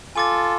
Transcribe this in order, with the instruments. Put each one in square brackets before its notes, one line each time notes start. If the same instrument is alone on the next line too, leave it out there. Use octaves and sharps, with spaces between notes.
[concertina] F4 A4 [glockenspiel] G#5 D6 A6